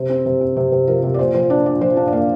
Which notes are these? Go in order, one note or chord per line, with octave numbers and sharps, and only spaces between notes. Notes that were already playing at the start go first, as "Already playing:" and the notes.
Already playing: C3 C5
C4
C3
C4
C3
C3
F3 A#4
C3
D5
A#2 C5
F3 C5
D4 D5
A#2 D5
F3 C5
D4 F5
D5
A#3 F5